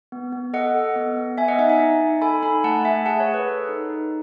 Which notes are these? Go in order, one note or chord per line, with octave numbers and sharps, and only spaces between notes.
B3
B3
A4 D#5 F#5
A4
B3
B3
B3 E5 G#5
D#5 F#5
D#4 E5 G#5
E5 G#5
D#4
D#4
A4 G#5 B5
D#4 G#5 B5
A3 F#5 A5
A3 E5 G#5
G#4 F#5 A5
C#5
G#4
B4
A4
D#4
D#4